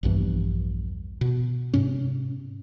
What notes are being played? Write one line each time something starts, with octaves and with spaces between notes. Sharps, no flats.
A#1 E2 G2 E3
B2
G#2 C3 C#4